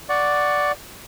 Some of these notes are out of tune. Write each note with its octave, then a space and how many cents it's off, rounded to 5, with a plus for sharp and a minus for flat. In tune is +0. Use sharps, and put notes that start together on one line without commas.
D5 +0 F#5 +0 C#6 +0